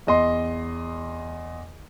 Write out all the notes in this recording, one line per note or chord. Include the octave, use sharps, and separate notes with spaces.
E2 D#5 C6